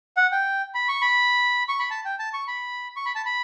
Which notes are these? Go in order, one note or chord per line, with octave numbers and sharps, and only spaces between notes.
F#5
G5
B5
C#6
B5
C#6
B5
A5
G5
A5
C#6
B5
C#6
B5
A5
B5